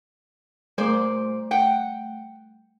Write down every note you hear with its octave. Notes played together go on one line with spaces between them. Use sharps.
A#2 G3 A3 C5 D5
F#5 G5